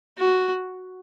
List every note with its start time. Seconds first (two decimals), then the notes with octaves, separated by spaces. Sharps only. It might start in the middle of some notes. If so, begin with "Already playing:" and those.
0.18 F#4